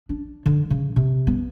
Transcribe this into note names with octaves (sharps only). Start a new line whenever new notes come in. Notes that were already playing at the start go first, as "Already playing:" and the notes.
D4
D3
C#3
C3
B3